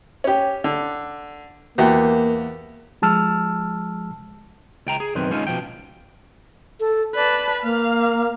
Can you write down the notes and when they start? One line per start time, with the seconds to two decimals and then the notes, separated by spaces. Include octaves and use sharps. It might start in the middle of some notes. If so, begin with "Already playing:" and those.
0.24 C#4 G4
0.64 D3
1.78 E2 A#3 F#4 G4
3.02 F3 G#3 A5 E6 F6
4.86 C#2 G5 A#5
5.00 G#4
5.15 B1 F#2 D#3 C4 B4
5.31 G#3 C#4 D#4 F4
5.47 B2 F3 G5
6.80 A4
7.15 B4 D5 A5
7.63 A#3 F5